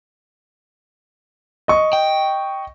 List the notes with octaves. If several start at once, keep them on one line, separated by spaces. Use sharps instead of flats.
D#5 C#6
G5